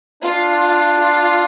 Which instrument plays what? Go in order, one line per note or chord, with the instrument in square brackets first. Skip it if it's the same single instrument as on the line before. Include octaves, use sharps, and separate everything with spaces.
[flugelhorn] D4 [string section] F4
[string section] F4